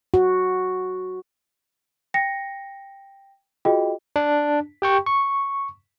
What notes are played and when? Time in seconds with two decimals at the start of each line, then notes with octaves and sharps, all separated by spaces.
0.14 F#4
2.14 G5 A#6 C#7
3.65 F4 F#4 G#4 D#5 G5
4.16 D4
4.82 G4 G5 C#6
5.06 C#6